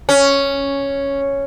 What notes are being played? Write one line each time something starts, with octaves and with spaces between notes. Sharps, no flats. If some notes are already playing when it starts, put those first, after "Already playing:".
C#4